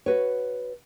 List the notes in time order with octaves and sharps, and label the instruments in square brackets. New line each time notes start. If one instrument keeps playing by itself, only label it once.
[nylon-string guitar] F#4 B4 C#5